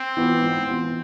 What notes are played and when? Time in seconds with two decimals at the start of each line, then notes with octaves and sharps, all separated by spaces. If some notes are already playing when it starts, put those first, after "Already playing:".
Already playing: C4
0.17 E3 B3 F4
0.42 G#2
0.67 E3 B3 F4